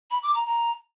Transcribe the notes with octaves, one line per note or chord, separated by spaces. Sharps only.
B5
D6
A#5
A#5